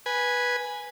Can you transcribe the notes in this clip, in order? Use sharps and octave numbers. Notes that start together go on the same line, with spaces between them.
B4 G#5